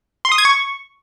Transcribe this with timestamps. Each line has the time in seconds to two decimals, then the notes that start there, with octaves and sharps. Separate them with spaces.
0.25 C6
0.32 D#6
0.38 G#6
0.45 C#6